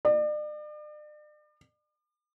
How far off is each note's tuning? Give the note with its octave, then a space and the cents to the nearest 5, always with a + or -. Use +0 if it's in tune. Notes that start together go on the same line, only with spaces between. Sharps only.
D5 +40